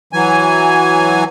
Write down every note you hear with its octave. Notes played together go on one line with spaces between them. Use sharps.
E3 F#3 G#5